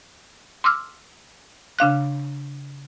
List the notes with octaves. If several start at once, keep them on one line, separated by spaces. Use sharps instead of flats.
C6 D6 E6 F6
C#3 D4 F5 F#6